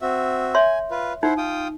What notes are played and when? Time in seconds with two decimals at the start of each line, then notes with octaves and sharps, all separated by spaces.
0.01 C4 F#4 E5
0.55 C#5 E5 G#5 C6
0.91 F4 B4
1.23 D#4 E4 C5 F#5
1.37 F4 G5 D#6